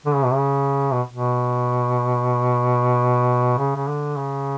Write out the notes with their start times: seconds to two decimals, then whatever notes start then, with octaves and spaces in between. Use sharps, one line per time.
0.06 D3
0.15 C#3
0.24 B2
0.33 C#3
0.93 B2
1.11 B2
3.58 C#3
3.76 C#3
3.88 D3
4.17 C#3